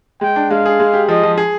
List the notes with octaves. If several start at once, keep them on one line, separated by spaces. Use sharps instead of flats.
G#3 G5
D4
G#3 F5
G#4
G#3
G4
F3 D#5
F3
G#4